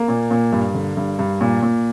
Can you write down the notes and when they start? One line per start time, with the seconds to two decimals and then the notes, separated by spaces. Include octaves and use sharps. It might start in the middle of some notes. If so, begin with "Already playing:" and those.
Already playing: A#3
0.08 A#2
0.31 A#2
0.52 G2
0.74 D3
0.97 G2
1.19 G2
1.41 A#2
1.63 A#2